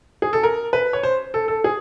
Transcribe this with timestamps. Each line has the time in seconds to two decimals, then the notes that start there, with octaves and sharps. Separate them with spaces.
0.22 G#4
0.33 A4
0.43 A#4
0.73 B4
0.93 C#5
1.03 C5
1.34 A4
1.48 A4
1.64 G#4